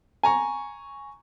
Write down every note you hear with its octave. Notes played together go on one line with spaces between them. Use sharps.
G#5 A#5 C#6